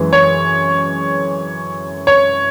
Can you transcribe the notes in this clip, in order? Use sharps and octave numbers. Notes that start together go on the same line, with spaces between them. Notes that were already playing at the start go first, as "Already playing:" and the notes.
Already playing: F#2 E3 G#3
C#5
C#5